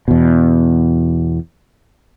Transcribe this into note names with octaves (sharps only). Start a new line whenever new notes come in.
E2 B2